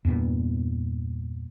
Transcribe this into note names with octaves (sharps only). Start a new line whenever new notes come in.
E2 G2 A#2 B3